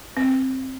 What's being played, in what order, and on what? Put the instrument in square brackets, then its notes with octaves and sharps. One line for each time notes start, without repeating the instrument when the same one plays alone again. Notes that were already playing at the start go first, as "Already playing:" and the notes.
[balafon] C4